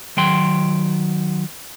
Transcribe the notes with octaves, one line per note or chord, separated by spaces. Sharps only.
D#3 F#3 G5 C6